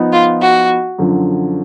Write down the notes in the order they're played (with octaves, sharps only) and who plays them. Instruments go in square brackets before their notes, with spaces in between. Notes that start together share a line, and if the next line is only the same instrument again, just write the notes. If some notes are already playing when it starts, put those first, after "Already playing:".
Already playing: [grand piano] F3 B3 D#4
[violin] F4
F#4
[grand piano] F#2 D3 F3